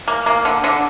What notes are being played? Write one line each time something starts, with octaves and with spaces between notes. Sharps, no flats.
A#3
A#3
D3
D3